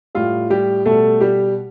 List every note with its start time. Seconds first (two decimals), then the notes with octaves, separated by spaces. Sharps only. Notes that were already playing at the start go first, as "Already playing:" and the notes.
0.15 A2 G3 F4
0.50 G3 G4
0.86 B2 G3 A3 A4
1.20 G3 G4